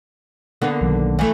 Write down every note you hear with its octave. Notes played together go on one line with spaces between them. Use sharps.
D3 A#3 B3
B1 D#3 F#3
E3 A3